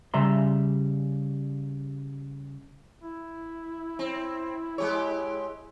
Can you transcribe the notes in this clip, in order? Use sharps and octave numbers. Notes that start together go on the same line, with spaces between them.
C#3 G3 E5 A#5 C6
E4
C4
G#3 G4 C#5